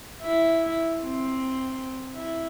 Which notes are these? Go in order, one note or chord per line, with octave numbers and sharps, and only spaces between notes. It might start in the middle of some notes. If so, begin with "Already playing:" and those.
E4
C4
E4